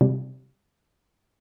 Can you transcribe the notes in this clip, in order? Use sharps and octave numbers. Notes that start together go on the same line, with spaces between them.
C3 G3